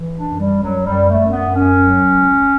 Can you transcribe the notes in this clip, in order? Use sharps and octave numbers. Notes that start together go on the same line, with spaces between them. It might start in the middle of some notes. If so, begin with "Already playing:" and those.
Already playing: E3
D4
F#2
G3
F#2
F#3
F#2 G3
A3
F#2
B3
F#2
C#4
F#3
C#2